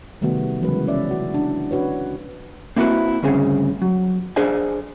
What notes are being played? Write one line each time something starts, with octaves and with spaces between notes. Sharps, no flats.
C3 D#3 G3 A3 B3 F#4
C#3 E3 F#3 G#3 B4
C#4 D5 E5
F#4
D4 E4
C#4 D4 F#4 B4 C#5
A#3 C4 E4 F#4 A#4 B4
D2 G2 C#3 C4 G#4
F#3
D4 G#4 C5 D5 G#5